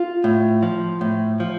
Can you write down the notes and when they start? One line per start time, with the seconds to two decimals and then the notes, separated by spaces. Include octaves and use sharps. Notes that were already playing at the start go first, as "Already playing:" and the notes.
Already playing: F4
0.24 A2
0.63 F3
1.01 A2
1.40 F3